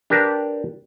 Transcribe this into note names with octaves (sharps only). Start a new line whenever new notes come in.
D4 G4 A#4 B4 A5